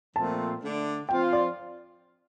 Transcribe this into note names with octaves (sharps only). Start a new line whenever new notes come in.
A#2 F3 A3 C4 F4 A5
D3 A3 D4
F3 C4 F4 G5
D5